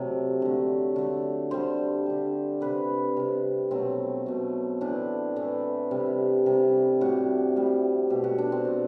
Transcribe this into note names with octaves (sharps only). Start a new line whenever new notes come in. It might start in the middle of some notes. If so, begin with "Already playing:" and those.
Already playing: C3 F#3 A3 D5
D3 A3
D3 A3
D3 G3 C5
D3 G3
C3 G3 B4
C3 G3
B2 F#3 A3 C4
B2 F#3 A3
A2 E3 A3 D4
A2 E3 A3
C3 G3
C3 G3
A2 G3 F#4
A2 G3
B2 A3 G4
F#4
D4
C4
B2 A3